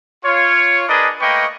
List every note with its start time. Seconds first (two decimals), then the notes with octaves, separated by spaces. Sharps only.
0.24 F4 C#5
0.87 D4 G#4 A#4 B4 D5 D#5
1.20 A3 A#3 B4 D#5 G5 C#6